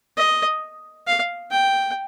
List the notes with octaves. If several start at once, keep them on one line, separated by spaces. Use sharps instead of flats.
D#5
F5
G5